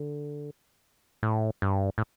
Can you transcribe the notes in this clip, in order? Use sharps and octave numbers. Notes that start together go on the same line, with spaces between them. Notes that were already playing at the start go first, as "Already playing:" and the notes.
Already playing: D3
A2
G2
A2